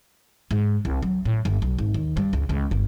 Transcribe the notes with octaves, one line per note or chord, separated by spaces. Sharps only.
G#2
C2
F#3
A2
G1
B1
G#1
D#2
G2
C#2
C#2
G1